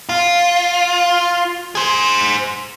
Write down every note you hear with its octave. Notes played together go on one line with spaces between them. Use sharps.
F4
G#4 C5